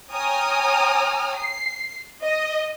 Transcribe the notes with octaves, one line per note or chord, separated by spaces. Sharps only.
C#5 G5 G#5 A#5 D#6 F6
C7
D#5